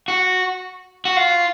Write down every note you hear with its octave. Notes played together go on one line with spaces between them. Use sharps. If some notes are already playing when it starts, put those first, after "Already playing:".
F#4
F#4
F4